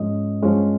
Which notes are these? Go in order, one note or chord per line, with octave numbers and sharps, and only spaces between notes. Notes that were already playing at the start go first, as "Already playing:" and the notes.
Already playing: G#2 F3 G#3 C#4 D#5
G2 F3 G#3 C#4